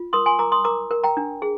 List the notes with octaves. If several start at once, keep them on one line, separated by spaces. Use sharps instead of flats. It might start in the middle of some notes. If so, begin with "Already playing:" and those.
Already playing: F4
A#4 C6 D#6
G#5 C6
A#4 A#5 D6
C6 D#6
A#4 A#5 D6
A#4
G5 A#5
D4
G#4